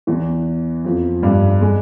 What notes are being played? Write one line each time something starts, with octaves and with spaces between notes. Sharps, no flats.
E2 E3
F2 F3
G2 G3
G#3